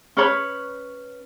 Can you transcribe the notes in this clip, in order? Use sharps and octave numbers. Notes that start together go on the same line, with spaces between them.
C#4 B4 C#5 B5